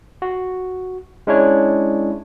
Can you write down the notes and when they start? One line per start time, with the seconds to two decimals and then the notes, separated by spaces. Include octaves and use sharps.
0.22 F#4
1.27 G#3 C#4 D4 E4 C#5